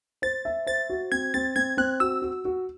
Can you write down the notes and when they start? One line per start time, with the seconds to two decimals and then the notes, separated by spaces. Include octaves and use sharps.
0.22 C5 A6
0.45 E5
0.67 C5 A6
0.90 F#4
1.12 C4 G#6
1.34 C4 A6
1.56 C4 G#6
1.77 C4 F#6
2.00 F#4 E6
2.22 F#4
2.45 F#4